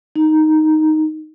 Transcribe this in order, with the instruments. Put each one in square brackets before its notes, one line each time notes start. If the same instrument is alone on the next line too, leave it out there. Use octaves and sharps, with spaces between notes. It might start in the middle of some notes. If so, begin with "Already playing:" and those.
[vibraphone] D#4